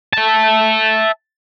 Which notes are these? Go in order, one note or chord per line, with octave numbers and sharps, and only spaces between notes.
E5 A5